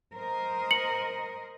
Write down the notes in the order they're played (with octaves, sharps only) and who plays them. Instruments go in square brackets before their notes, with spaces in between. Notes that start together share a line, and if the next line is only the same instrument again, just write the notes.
[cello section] A#4 C5 D#5
[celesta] C#7 F#7